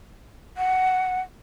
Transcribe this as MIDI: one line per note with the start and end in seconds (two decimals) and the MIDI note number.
0.57 1.21 78